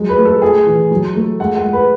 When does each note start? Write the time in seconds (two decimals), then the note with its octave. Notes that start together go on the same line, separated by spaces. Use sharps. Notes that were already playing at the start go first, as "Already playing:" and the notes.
Already playing: F#3 G#3
0.09 B4
0.17 A3
0.25 A4
0.42 A3 G#4
0.66 E3
0.91 F#3
1.15 A3
1.40 G#3 F#5
1.57 F#5
1.64 G#3
1.73 B4